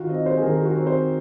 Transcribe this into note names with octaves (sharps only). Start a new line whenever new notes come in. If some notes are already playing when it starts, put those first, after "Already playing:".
Already playing: D#3 F4 F#4
C4 D#5
C5
G#4
D#3 A#4
G#4
F#4
C4
C5